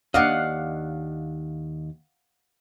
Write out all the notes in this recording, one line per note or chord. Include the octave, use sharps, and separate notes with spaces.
D#2 D4 D#5 F5 F#5